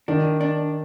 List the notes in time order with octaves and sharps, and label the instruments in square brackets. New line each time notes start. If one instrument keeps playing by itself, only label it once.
[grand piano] D#3 [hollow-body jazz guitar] D4
[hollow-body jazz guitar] D4